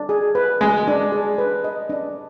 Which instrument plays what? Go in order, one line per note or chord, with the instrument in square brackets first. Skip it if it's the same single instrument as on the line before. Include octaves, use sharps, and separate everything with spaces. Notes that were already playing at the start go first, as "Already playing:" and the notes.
Already playing: [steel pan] D4
G#4
B4
[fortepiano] G#3 [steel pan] D#5
[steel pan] D4
G#4
B4
D#5
D4